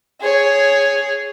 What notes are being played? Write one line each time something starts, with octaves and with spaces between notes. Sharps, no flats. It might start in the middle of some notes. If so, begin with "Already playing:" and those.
G#4 C#5